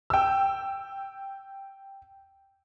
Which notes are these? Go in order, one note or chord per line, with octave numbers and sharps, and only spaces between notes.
G5 E6